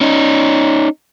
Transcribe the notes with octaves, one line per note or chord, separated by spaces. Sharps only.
C#4 D#4